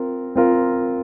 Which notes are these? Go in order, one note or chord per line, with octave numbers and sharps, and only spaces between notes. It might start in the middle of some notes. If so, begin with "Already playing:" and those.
Already playing: C4 F4 A#4
C4 F4 A#4